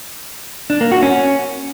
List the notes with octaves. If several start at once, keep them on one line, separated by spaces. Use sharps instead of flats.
D4
A#3
F#4
C#4